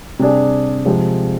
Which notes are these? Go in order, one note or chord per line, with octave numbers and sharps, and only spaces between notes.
C3 G3 D4 G#4 D5
C3 F3 G#3 C4